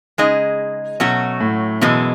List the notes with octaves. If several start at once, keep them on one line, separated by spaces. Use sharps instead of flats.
C#3 G#3 D#4 G#4 D#5
B2 F#3 A3 C#4 F#4
A2
F#2 B2 E3 G#3